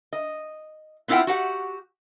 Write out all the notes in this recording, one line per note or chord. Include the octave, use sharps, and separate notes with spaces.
D#5
B3 C4 E4 F4 F#5 G5
F#4 G4 F#5